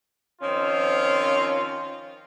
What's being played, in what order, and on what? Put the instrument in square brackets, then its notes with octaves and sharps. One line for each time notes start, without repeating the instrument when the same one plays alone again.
[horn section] D#3 F3 C4 C#4 F4